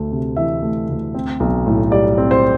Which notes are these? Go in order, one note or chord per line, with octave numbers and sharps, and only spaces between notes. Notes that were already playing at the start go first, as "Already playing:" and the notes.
Already playing: D2 A3
C3
E3 E5
A3
D2
C4
B1
A2
G3 D5
C4
C5